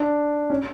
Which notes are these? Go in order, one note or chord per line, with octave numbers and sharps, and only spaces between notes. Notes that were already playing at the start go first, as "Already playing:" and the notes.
Already playing: D4
C#4